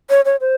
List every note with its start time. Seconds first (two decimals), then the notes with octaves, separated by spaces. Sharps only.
0.10 C#5
0.25 C#5
0.41 C5